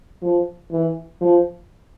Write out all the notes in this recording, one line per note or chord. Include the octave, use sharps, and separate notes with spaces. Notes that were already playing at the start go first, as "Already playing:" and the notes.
F3
E3
F3